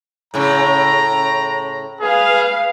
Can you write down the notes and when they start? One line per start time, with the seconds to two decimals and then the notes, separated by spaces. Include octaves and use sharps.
0.34 A2 C#3 A#5
2.01 G#4 B4 F5